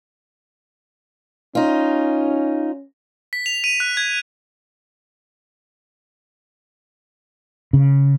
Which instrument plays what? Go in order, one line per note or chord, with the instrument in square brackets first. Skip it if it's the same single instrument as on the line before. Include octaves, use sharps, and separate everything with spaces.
[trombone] C#4 [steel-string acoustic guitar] D#4 F4
[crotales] B6
F7
D#7
F#6
G#6
[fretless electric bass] C#3